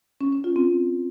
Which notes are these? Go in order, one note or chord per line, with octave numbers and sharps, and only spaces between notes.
C#4
C#4
F4
C4